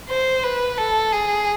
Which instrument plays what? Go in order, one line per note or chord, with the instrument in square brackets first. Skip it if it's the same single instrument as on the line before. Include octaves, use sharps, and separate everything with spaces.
[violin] C5
B4
A4
G#4